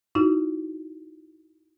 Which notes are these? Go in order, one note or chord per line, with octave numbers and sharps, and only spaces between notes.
D#4 E4 F#4